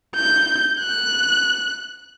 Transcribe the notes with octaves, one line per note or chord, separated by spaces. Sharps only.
G6
F#6